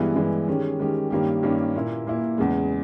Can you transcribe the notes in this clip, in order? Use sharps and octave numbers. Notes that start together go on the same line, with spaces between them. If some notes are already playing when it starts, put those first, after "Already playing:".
Already playing: G2 E3 G#3 B3 E4
G2 E3 G#3 B3 E4
D#3 G#3 C#4 G4
D#3 G#3 C#4 G4
G2 D#3 A#3 C#4 G4
G2 D#3 A#3 C#4 G4
A#2 A#3 E4
A#2 A#3 E4
E2 C#3 G#3